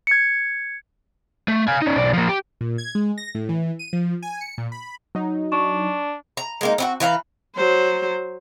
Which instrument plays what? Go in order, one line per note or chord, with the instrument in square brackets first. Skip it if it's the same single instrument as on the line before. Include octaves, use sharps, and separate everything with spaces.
[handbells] G#6 C#7
[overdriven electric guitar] A3
F5 G#5
C#4 D#4
B1 D5
F3 A#3
G4
[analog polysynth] A#2
G#6
G#3
A#6
A2
E3
D#7
F3
G#5
C#7
A#2
B5
[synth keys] F#3 D#4
[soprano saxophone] D4 [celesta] C#6
[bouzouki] A#5
G#3 A#3 D#4
C4 D#4 F#4
E3 B4 F5 A#5
[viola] F#3 C5